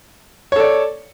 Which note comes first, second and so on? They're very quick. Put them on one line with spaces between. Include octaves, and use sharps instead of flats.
C#5 A4 D5